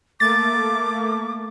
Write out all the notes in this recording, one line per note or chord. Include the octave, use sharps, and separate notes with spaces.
A3 A#3 D6 A6